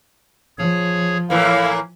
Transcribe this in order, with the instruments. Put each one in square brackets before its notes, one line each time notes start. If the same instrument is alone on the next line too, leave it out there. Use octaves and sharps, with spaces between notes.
[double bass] F3 [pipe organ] G#4 C#5
[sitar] A2 E3 A#3 [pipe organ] E4 [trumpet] F5